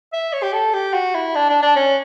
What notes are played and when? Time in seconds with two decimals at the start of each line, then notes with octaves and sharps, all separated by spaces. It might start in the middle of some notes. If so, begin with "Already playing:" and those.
0.13 E5
0.33 C#5
0.43 G4
0.53 A4
0.74 G4
0.94 F#4
1.15 E4
1.35 D4
1.50 D4
1.63 D4
1.76 C#4